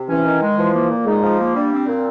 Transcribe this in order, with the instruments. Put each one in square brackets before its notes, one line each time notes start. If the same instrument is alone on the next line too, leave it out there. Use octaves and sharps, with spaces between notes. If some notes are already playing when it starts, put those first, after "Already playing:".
Already playing: [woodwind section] C3
[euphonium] E3 [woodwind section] C#4
[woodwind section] D#3
G#3
[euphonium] E3 [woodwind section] F3
[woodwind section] A#3
A#2
[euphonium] G#3 [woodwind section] D#4
[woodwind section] F3
A#3
[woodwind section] G3 [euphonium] D4
[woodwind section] C4
A#2